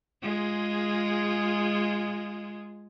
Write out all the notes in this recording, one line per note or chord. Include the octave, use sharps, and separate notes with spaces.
G#3 F4 G#4